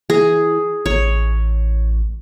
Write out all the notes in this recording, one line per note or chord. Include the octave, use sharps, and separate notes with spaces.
E3 G#4
A1 C#5